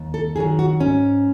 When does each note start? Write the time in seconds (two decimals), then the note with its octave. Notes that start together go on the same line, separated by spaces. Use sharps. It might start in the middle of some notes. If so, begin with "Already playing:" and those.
Already playing: D#2
0.14 A4
0.36 D#3 F#3 G#4
0.59 F#4
0.80 G#2 C#4